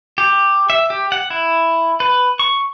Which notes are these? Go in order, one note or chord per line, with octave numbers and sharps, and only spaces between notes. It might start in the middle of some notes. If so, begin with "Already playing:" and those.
G4
E5
G4
F#5
E4
B4
C#6